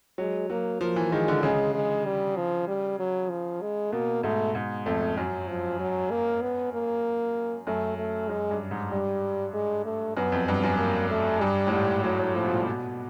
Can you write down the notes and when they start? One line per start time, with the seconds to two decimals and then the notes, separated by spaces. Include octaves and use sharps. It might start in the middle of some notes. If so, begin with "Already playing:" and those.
0.18 F#3 G#3
0.50 F#3 A#3
0.81 F3 A#3
0.96 E3
1.12 D#3 G#3
1.28 D3
1.43 C#3 G#3
1.74 G#3
2.06 G3
2.37 F3
2.68 G3
2.99 F#3
3.30 F3
3.61 G#3
3.92 B2 A#3
4.23 G#2 A3
4.55 G#2
4.86 F2 A3
5.17 F#2 F#3
5.48 F3
5.79 F#3
6.11 A#3
6.42 B3
6.74 A#3
7.67 F#2 A3
7.98 A3
8.29 F#2 G#3
8.50 G2
8.71 G#2
8.92 G2 G3
9.54 G#3
9.85 A3
10.17 F#2 B3
10.32 F2
10.47 G2 B3
10.64 F#2
10.78 A#3
11.10 A3
11.41 G2 G3
11.67 A2
11.72 G#2 G3
12.03 A2 F#3
12.20 A2
12.35 A2 F3
12.43 B2
12.51 A#2
12.66 B2